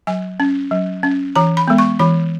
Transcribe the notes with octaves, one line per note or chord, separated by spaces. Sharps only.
F#3 G#5
C#4
F#3
C#4
E3 A#5
B5
G#3 B3
C#6
E3 B5